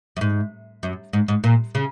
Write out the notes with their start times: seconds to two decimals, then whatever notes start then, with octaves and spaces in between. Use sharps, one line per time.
0.17 F#2
0.21 G#2
0.83 F#2
1.13 G#2
1.28 G#2
1.44 A#2
1.75 C#3